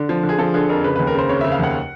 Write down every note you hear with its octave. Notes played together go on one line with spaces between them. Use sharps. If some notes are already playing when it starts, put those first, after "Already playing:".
Already playing: D3
F3
D3
G#4
F3 A4
D3 G#4
F2 A#4
C#3 B4
D#2 B4
A#4
C#3 C5
C#3 C#5
C#3 E5
F5
D#2 F#5